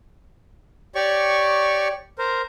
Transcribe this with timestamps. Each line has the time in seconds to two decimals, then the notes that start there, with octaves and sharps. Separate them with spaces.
0.95 G4 C#5 D5 C#6
2.18 A#4 C5